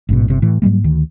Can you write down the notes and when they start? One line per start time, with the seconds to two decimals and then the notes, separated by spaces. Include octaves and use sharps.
0.09 A1 G#2 B2
0.28 G1 C3
0.42 A2 E3
0.62 G#2 F#3 G3 A#3
0.84 D2 D#3